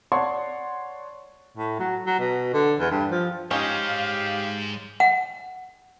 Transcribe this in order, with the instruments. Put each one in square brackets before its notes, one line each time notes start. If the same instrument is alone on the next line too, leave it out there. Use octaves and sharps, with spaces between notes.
[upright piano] C#5 D5 F#5 A5 C6 C#6
[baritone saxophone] A2
F#3
F#3
B2
D3
E2
G2
F3
[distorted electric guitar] G#2 G#3 [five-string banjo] C#4 D#4 [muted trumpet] G4 [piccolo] F5
[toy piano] F#5